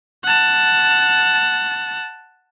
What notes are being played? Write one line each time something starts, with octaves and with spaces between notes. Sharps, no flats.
F#5 A5